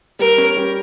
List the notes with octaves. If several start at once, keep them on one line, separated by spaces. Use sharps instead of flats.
G3 A#4
C#4
G3